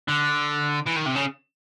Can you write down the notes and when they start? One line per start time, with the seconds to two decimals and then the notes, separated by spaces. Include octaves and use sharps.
0.08 D3
0.86 E3
0.96 D#3
1.06 C3
1.15 C#3